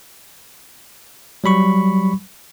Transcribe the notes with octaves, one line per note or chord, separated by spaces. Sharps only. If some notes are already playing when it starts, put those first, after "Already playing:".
F#3 G3 B5 C#6